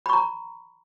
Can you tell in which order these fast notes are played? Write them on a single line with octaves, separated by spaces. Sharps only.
B5 C#6 A#5